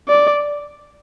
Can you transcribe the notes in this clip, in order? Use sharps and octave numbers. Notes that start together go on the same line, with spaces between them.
D5